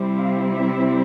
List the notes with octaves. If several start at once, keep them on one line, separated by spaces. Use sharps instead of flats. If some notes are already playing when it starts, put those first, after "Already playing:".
Already playing: C3 G3 C4 E4
F5
E5